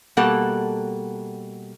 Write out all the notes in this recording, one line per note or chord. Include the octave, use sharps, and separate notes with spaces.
B2 G3 A#3 A4 F#5 A5